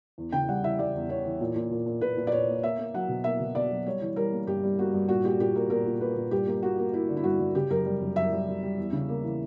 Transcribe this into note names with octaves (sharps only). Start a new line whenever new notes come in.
E2
C#3 G5
G3 F#5
E3 E5
G3 D5
E2
E2 C#5
E3
A#2
A#2
A#2
A#2
A#2 B4
A#2
D5
A#2 C#5
A#3
A#3 E5
A#3
F#3 F#5
B2
A#3 E5
B2
B2 D5
F#3
G3 C#5
E3
G3 A#4
A#3
G2 G4
G3
A#3 F#4
G2
A#2 F#4
A#2 G4
A#2 G4
A#3 A#4
A#2 A#4
A#2
A#3 B4
A#2
G2 G4
A#3
A#3 F#4
A#3
A#3 E4
D3
E4
G2 F#4
G2
C#3 G4
F#2 A#4
G3
F#2
F#2 E5
G3
G3
G3
E2
C#3
A#3
E3